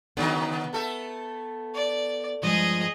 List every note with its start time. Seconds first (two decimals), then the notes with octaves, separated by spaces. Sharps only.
0.17 C3 D#3 F#3 B3
0.73 A3 A4 E5
1.74 D5
2.42 G2 F3 G#3 G#4 D#5